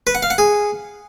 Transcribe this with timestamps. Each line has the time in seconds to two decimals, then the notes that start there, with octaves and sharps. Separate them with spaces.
0.07 B4
0.15 F#5
0.23 F5
0.30 F#5
0.38 G#4